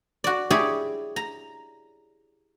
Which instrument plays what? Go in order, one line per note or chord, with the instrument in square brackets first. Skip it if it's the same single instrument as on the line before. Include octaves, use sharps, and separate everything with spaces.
[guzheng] F#4 D5
E4 G4 G#4 C#5 D5
A#5